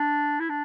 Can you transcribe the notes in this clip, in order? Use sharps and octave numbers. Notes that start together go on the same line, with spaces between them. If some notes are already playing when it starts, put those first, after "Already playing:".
Already playing: D4
E4
D4